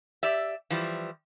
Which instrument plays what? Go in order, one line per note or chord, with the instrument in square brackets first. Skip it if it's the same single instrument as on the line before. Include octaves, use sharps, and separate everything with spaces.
[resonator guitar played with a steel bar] G4 D5 E5
E3 F3 G3